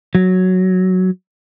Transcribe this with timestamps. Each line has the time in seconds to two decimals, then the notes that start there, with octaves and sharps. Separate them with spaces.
0.15 F#3